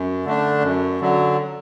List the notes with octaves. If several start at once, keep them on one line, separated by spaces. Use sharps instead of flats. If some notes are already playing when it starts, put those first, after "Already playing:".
Already playing: F#2
D3 A3 D4
F#2
D3 F#3